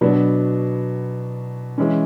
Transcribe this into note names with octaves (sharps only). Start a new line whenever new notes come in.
B2 F#3 B3 D4
E3 G#3 C#4